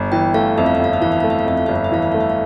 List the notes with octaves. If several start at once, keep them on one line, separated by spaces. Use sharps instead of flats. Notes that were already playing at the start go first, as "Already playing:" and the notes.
Already playing: G1
E3 G5
A3 F5
F2 E5
F5
E5
G1 F5
E5
E3 F5
E5
A3 F5
E5
F5
F2 E5
F5
G1 E5
F5
E5
E3 F5
E5
A3 F5
E5
F5